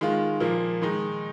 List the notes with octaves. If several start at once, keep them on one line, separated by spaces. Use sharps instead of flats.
D#3 G#3 F4
A#2 F3 A#3
D#3 G#3 D#4